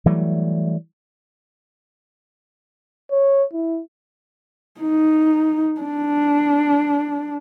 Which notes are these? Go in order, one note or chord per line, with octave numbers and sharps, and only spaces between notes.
E3 F#3 G3 A3
C#5
E4
D#4
D4